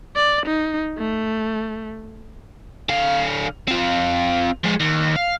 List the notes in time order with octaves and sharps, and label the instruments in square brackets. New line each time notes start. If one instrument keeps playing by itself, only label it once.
[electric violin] D5
D#4
A3
[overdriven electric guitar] D3 F5
C4 F4
F3 G#3
D#2
F5